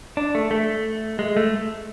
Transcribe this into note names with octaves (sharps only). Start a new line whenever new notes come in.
D4
A3
A3
G#3
A3